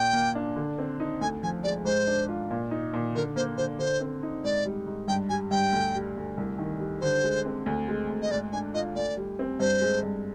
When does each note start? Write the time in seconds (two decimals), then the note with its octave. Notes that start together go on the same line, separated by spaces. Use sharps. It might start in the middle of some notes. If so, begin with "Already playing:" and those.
Already playing: A#2 G5
0.13 A#3
0.35 D4
0.56 D3
0.78 C4
1.00 D#4
1.21 D2 G#5
1.43 F3 G#5
1.63 G#3 D5
1.85 G#2 C5
2.07 D4
2.28 F4
2.51 A#2
2.71 D#4
2.93 A#2
3.15 D3 A#4
3.36 A#3 C5
3.57 D3 C5
3.79 D3 C5
4.01 C4
4.23 D#4
4.44 G#2 D5
4.65 G3
4.86 G#2
5.08 G2 G5
5.29 G3 G#5
5.51 G2 G5
5.73 D2
5.95 G3
6.16 D2
6.37 C2
6.58 D#3
6.80 G3
7.01 D3 C5
7.24 G#3
7.45 C4
7.66 D2
7.88 G#3
8.09 D2
8.22 D#5
8.31 G#2 D5
8.52 D4 G#5
8.74 F4 D#5
8.95 D2 D5
9.17 G3
9.39 C4
9.59 G2 C5
9.82 G#3
10.03 G2